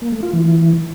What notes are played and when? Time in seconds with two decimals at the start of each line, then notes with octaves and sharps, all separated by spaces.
0.02 A#3
0.12 A3
0.23 F4
0.33 E3